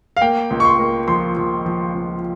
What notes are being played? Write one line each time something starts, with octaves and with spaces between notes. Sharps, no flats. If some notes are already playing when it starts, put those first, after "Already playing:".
F5
A#3 G5
C#2
C#6
C6
A#3
F3 C6
F3
F3
C#2